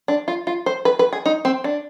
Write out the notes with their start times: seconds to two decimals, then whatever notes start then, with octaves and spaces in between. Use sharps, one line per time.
0.08 D4
0.28 F4
0.47 F4
0.66 C5
0.85 B4
0.99 B4
1.13 G#4
1.26 D#4
1.45 C4
1.64 D4